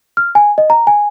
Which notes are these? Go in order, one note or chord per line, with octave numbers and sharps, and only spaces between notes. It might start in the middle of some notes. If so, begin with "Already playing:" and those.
F6
G#5
D#5
A#5
G#5